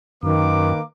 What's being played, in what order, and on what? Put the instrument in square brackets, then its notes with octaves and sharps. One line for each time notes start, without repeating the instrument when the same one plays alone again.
[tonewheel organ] F#2 [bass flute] D#3 [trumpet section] A#3 B4 D6